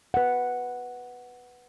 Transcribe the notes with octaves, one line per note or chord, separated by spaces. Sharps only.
B4 F#5